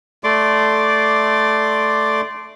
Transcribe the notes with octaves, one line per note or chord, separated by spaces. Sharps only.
A3 D5 C6 D6